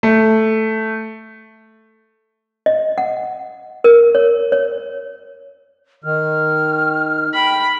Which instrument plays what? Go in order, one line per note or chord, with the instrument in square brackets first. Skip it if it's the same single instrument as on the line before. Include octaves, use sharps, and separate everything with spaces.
[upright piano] A3
[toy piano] D#5
F#5
A#4
C#5
C#5
[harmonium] D#3 [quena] F6
[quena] G5 [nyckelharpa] B5